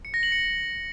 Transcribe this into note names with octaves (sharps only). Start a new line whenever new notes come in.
C#7
A#6
F#7
C#7